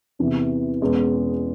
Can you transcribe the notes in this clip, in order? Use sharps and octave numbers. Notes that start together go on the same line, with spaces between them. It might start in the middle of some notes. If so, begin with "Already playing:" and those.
E2 C3 E3
E2 B2 G#3 C#4